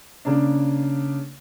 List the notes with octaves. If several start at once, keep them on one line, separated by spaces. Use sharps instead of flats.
C#3 A#3 D4